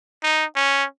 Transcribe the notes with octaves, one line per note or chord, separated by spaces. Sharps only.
D#4
C#4